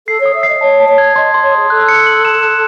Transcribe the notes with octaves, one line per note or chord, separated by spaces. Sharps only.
A4 C7
C#5
D#6
E5
C7
D#5
C#5 A5
A5
C#5
G#6
D#5 C6
C6
C#5
G#4 D#6
A4 F#6
C#7
F#7
E7
F#6